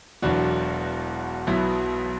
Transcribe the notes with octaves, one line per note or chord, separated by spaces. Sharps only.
E1 E2 B2 F#3 D4 F#4
B1 B2 F#3 B3 E4